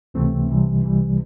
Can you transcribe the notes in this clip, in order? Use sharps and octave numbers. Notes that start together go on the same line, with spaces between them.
C#2 C3 E3 A3 C4
C2 C3 E3 G3
C2 C3 E3 G3